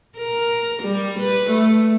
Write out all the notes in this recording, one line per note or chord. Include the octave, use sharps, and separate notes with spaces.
A#4
G3
B4
A3